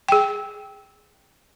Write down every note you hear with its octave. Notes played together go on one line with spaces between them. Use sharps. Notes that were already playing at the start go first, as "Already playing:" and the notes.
G#4 G5